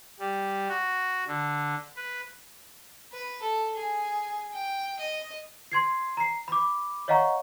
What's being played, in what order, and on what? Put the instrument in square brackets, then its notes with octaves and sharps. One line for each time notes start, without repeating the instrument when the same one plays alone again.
[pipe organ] G3
F#4
D3
B4
[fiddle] B4
A4
G#4
G5
D#5
[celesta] C6 G#6 C7
A#5 C7
B5 D6
C#5 D#5 F5 F#5 A#5 C#6